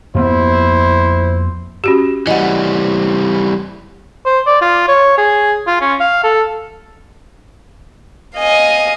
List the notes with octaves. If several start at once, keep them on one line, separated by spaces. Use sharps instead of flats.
F2 A#3 B3 E4 C5
C#4 F#4 G4
E3 G3 D#5 F#5
C5
D5
F4
C#5
G#4
F4
C#4
F5
A4
D#5 F5 G#5